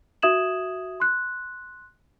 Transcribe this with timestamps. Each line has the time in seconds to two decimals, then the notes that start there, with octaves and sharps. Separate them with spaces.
0.22 F#4 E5 D#6 G#6 E7 F#7
1.00 C6 F#6